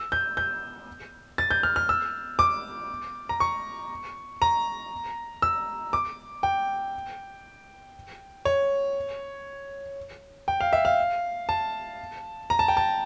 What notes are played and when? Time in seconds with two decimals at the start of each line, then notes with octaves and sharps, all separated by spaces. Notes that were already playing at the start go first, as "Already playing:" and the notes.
Already playing: E6
0.12 G6
0.37 G6
1.38 A6
1.51 G6
1.63 F6
1.76 F6
1.89 E6
2.39 D6
3.29 A#5
3.40 C#6
4.42 A#5
5.42 E6
5.93 D6
6.43 G5
8.45 C#5
10.48 G5
10.61 F5
10.73 E5
10.85 F5
11.49 A5
12.50 A#5
12.59 A5
12.68 G5
12.77 A5